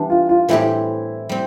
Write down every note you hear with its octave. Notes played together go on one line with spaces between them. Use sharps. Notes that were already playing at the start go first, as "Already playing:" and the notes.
Already playing: E3 G3 B3 D4
F4
F4
A2 E3 G3 C4 E4 G4
G3 C4